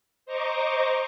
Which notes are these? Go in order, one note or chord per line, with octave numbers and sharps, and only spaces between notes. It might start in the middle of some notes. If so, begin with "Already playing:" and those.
C5 D#5 A#5 C#6 D6